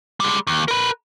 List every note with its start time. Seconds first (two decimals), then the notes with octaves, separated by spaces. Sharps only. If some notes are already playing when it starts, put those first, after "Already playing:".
0.20 G3 G#3
0.47 D#2
0.68 A#4 B4